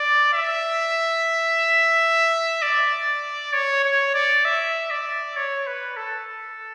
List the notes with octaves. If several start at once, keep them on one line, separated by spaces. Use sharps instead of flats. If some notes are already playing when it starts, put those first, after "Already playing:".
Already playing: D5
E5
D5
C#5
C#5
D5
E5
D5
C#5
B4
A4